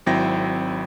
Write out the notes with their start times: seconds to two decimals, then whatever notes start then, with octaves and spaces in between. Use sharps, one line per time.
0.06 G#1 F#3 C4 E4 G5 A#6